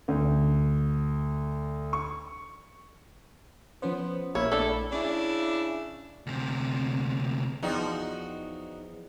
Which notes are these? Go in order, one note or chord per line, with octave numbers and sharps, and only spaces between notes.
D2
C#6
F3 B3 C#4 C5
A#1 A#3 E4 C#5
A3 D4 A4
C#3 D4 E4
D2 C3
E2 F3 D#4 F#4 D5 D#5 G5